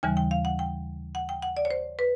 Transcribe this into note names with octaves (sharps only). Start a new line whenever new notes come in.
D#2 C#3 E3 G3 G#5
G5
F5
F#5
G5
F#5
G5
F#5
D5
C#5
C5
B4